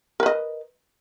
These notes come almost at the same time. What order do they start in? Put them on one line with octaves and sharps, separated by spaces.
A#4 B4 D#5